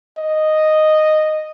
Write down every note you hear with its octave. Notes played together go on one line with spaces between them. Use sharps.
D#5